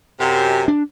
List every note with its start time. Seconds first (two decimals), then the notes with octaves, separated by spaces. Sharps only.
0.20 F#2 C3
0.68 D4